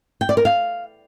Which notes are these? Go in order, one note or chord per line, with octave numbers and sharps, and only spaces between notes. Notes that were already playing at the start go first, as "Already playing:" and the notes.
G5
D5
A#4
F5